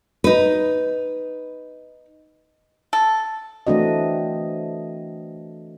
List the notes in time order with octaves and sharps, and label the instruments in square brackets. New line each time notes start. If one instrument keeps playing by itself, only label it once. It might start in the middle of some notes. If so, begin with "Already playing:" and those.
[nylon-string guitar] D#4 B4
[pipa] A4
[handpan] E3 A3 C4 D4 F#4 D#5